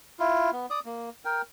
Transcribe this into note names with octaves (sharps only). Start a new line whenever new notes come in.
E4 F4
B3
D5 D#6
A#3
A#4 G5